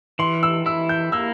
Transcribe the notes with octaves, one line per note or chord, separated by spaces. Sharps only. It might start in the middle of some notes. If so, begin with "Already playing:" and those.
E3 C6
E6
E4 E6
G6
A#3 E6